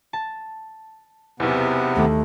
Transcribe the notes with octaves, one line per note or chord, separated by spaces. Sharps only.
A5
B1 E2 C3 B3
D#2 A3